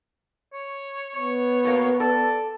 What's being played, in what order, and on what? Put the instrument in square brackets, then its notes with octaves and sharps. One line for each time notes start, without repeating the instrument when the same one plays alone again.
[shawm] C#5
[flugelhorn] B3 [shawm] C#5
[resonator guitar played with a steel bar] B2 A#3
[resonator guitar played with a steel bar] A4 [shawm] D5